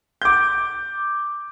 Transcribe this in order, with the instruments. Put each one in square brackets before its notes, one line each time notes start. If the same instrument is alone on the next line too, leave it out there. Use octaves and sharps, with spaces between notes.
[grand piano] D6 G6